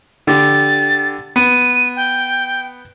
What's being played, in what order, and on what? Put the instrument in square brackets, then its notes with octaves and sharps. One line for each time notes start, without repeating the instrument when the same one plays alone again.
[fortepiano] D3 G4 [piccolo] A6
[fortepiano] B3 [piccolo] D#7
[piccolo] G5